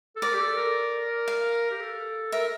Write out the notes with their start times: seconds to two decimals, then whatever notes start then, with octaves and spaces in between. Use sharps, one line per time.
0.16 A4
0.22 A#4 D5
0.33 G4
0.40 A4
0.57 A#4
1.28 F5
1.71 G4
1.81 A4
2.32 A#4 E5